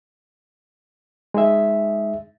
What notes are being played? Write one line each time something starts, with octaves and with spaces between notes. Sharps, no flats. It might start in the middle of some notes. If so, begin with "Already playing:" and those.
G#3 D#4 G#4 E5